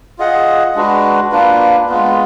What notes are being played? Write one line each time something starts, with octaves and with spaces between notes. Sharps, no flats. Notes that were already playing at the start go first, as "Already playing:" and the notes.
F4 G#4 D#5 F#5
G#3 D4 F#4 B4
A#3 D4 F4 B4
G#3 B3 F4